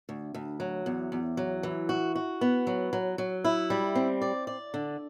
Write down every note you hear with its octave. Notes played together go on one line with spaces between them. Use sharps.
D2
D2
F#3
E2
E2
F#3
E3
F#4
F#4
B3
F#3
F#3
F#3
E4
G3
C4
D5
D5
D3